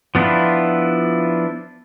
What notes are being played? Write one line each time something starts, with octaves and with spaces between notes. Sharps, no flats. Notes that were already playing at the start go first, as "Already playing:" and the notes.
F3 B3 D4 E4 F4